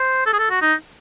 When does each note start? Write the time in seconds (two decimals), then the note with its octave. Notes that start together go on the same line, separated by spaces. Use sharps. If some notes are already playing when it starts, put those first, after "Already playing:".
Already playing: C5
0.26 A4
0.33 G#4
0.39 A4
0.50 F#4
0.62 D#4